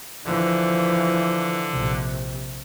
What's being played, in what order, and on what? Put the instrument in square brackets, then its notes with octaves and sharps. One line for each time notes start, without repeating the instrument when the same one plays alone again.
[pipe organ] D3 [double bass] E3 F3
[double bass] A#1 C3